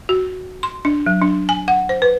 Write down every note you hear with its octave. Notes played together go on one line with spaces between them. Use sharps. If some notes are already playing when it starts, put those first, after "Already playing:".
F#4
C6
D4
F#3
D4
G#5
F#5
C5
B4